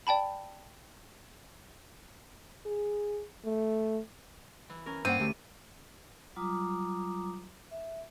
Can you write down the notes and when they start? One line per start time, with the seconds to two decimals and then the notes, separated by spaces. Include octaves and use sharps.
0.07 D5 G5 A5 B5
2.66 G#4
3.45 A3
4.69 E3
4.86 C#4 A#4
5.05 G2 A#3 C4 C#4 F#5 D#7
5.20 D2 A3 G4 E5
6.36 F#3 G3 F4 A#5 D6 D#6
7.71 E5